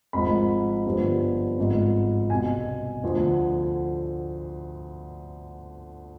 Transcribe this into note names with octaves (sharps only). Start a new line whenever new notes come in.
G#1 G#2 F3 B5
G1 G2 D3 F3
G#1 G#2 F3
C2 B2 G#5
D2 D3 F3